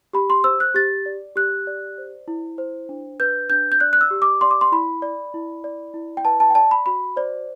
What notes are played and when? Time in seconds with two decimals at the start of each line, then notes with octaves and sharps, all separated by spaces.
0.14 G4 B5
0.30 C6
0.44 C5 E6
0.60 F#6
0.75 G4 A6
1.06 D5
1.36 G4 F#6
1.67 D5
1.98 C5
2.28 E4
2.58 C5
2.89 D4
3.20 B4 G6
3.50 D4 G6
3.72 G6
3.80 D5 F#6
3.93 F#6
4.01 E6
4.11 G4
4.22 D6
4.41 D5 C6
4.51 D6
4.61 C6
4.72 E4 B5
5.02 D5
5.34 E4
5.64 D5
5.94 E4
6.17 G5
6.25 B4 A5
6.40 A5
6.50 G5
6.55 D5 A5
6.71 B5
6.86 F#4 B5
7.16 C5 D5